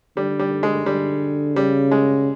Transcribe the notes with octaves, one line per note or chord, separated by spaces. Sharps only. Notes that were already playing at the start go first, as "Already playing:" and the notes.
D3 G3
G3
G#3
D3 G3
C#3 G3
G#3